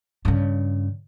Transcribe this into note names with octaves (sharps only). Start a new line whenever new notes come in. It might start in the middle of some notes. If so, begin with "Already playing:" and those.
G2 C#3